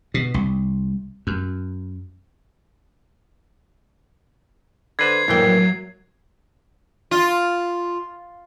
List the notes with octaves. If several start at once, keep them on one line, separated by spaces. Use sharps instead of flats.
B2
C2
F#2
D3 B4 C5 G#6 C7
A#1 A2 E3 F#3 A#3 G5
F4